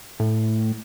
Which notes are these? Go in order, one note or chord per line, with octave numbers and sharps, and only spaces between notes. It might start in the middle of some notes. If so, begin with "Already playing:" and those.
A2